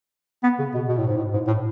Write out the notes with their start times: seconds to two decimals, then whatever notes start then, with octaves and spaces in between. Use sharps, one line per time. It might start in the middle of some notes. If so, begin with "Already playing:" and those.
0.43 B3
0.59 C#3
0.74 B2
0.89 B2
0.98 A2
1.07 G#2
1.16 A2
1.33 G#2
1.47 A2